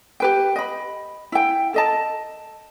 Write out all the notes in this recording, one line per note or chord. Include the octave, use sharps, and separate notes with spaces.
G4 B4 G5
D#5 B5
E4 G5
A4 D#5 A5